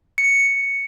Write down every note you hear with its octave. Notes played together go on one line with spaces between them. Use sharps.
C#7